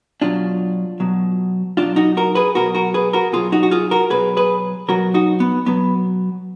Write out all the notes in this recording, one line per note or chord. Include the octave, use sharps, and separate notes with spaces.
B2 F#3 D4 F4
B2 F#3
B2 F#3 D4 F4
D#4 F#4
F#4 A#4
G#4 B4
B2 F#3 F#4 A#4
F#4 A#4
G#4 B4
F#4 A#4
B2 F#3 F4 G#4
D#4 F#4
F#4
F4 G#4
F#4 A#4
B2 F#3 G#4 B4
G#4 B4
B2 F#3 F#4 A#4
D#4 F#4
B3
B2 F#3 B3